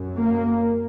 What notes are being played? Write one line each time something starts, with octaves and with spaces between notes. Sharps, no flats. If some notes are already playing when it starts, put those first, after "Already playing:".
Already playing: F#2
A#3